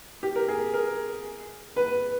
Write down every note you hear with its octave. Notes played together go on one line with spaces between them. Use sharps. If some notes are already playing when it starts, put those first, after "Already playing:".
G4
A#4
G#4
A#4
B4